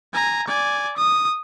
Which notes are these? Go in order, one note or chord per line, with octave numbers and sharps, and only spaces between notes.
G#5 A#5
D5 G#5
D#6